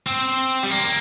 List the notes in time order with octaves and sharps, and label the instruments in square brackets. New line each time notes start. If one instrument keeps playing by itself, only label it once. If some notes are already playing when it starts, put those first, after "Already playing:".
[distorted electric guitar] C4
G3
A#3